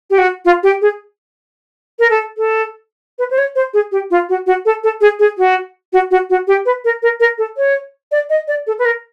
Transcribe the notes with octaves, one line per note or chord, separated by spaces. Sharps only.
G4
F#4
F4
G4
G#4
A#4
A4
A4
B4
C5
C#5
C5
G#4
G4
F4
F#4
F#4
A4
A4
G#4
G#4
F#4
F#4
F#4
F#4
G4
B4
A#4
A#4
A#4
A4
C#5
D5
D#5
D5
A4
B4
A#4